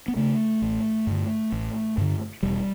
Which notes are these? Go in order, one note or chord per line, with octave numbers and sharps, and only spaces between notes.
B3
C#3 A3
A1
G2 D3
A1
G2 D3
E1 G3